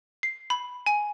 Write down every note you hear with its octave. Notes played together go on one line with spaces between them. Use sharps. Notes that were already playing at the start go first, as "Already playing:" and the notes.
C7
B5
G#5